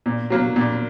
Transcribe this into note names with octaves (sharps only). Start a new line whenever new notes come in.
A#2
F#3 A#3
A#2